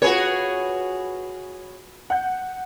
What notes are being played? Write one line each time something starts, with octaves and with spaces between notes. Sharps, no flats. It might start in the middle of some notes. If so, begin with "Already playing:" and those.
F4 F#4 G#4 B4 C#5
F#5 G6